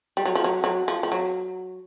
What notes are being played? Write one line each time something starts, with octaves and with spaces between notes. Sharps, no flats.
G3
F#3
F3
F#3
F#3
F3
F3
F#3